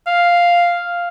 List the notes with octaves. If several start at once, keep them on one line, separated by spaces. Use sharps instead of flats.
F5